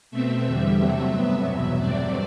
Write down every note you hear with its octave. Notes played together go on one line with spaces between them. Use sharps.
B2 A3 C4 E5
E2 D3 G3
C3 F#3 A3 C4
G2 F#3 B3
E2 B2 F#3 E5
G2 F#3 A3 C4 D5